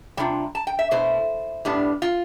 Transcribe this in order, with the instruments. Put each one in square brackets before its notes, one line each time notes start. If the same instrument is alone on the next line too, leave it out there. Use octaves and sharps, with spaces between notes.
[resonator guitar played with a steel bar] C3 G3 D4 F4 G5
A5
G5
E5
B2 A3 E4 C5
A2 G3 B3 D4
F4